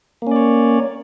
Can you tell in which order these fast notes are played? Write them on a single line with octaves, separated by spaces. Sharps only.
A#3 C#4 D5 C#5